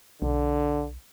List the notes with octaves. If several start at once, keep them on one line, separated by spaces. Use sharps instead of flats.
B1 D3